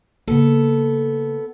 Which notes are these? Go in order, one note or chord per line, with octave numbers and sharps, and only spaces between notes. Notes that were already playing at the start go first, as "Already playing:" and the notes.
C#3 A#3 B3 A4